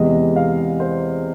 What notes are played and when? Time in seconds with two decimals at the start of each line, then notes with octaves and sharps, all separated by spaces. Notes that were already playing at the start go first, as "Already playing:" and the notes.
Already playing: E2 C3 E3 G#3 D#5
0.36 F5
0.80 C5